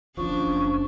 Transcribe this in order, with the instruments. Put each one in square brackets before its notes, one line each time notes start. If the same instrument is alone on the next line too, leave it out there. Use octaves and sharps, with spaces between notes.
[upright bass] F#1 [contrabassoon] F3 [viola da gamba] D4 [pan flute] C#6